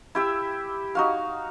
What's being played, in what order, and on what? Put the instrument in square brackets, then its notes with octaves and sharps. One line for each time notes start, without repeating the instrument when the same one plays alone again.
[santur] E4 G4 E5
D#4 F#4 F5